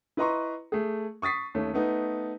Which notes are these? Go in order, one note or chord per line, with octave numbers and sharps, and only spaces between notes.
E4 B4 D#5 A#5 C6 C#6
A3 G#4
C#6 D#6 A6 B6 C7
D#2 A3 C#4
A3 B3 D#4